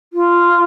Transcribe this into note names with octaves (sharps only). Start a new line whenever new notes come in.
F4